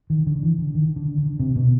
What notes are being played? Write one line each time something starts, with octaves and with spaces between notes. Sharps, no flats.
D#3
D3
E3
D3
D#3
D3
D3
C3
B2